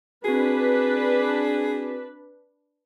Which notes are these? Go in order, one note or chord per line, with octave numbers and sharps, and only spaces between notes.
C4 D4 F#4 G#4 B4